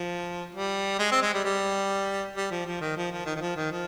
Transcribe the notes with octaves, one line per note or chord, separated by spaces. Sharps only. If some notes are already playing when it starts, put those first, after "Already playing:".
Already playing: F3
G3
G#3
C4
G#3
G3
G3
G3
F3
F3
D#3
F3
F3
D#3
D#3
F3
D#3
F3